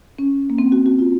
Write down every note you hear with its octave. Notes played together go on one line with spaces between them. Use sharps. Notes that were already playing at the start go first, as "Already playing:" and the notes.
C#4
A#3
C4
F#4
F#4
F4